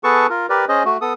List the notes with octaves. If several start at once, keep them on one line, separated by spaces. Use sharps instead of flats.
B3 G#4 A4 B4 A5 C#6
F4 A#4
G4 A#4 B4 D5
C#4 G#4 C5 D#5
A3 F#4
B3 A4 D#6